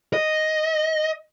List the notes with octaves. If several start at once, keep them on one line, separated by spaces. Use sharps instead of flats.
D#5